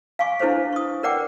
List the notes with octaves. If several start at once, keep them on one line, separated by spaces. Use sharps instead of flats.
F5 G#5 C#6 D6
D4 E4 A4 B4 C5 F5
C#6 D#6
A#4 B4 D5 F#5 G5 D6